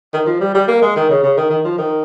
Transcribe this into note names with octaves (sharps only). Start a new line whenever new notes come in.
D#3
F3
G3
G3
A#3
G#3
D#3
C#3
C#3
D#3
D#3
F3
D#3